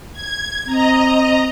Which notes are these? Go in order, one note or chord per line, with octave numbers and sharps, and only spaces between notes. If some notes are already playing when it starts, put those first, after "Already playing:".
G#6
C4 D#5 A#5